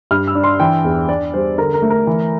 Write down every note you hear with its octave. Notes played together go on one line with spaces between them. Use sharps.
G2 F6
E6
D4
C6
E3 G5
E2
D4 D5
G3 C5
D3 A#4
A#4
A3
A#4
E3